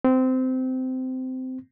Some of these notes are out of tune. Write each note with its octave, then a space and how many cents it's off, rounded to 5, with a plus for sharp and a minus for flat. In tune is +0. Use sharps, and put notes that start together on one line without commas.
C4 -20